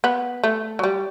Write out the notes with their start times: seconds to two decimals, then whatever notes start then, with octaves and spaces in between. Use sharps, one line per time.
0.04 B3
0.44 A3
0.79 F#3
0.84 G3